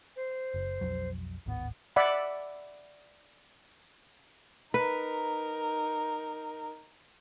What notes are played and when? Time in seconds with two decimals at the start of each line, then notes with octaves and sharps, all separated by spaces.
0.16 C5
0.54 F#1
0.81 B1 F2 F#3
1.46 D1 G#1 B3
1.96 D5 E5 F#5 B5
4.74 D#4 A#4 B4